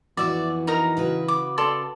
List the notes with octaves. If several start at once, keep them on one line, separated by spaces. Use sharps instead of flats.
F2 E3 B3 F#4 D5 E5
D#4 A#4 A#5
C#3 F#4 B4
D6
A4 D5 C6